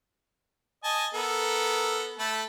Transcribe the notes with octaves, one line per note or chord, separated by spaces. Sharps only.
D#5 G#5 A5
B3 A4 A#4
A3 A5 B5